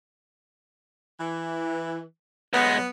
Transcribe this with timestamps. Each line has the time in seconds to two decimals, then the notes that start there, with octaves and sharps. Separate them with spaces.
1.19 E3
2.53 B1 G#3 B3